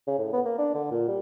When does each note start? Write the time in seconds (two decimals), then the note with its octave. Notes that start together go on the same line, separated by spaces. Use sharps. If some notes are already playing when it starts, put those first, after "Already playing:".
0.07 C#3
0.19 A2
0.33 B3
0.45 A#3
0.59 D4
0.74 D3
0.91 A#2
1.08 G3